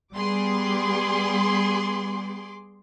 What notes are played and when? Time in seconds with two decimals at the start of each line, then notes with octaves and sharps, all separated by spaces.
0.14 G3 B3 G#4 C6 D6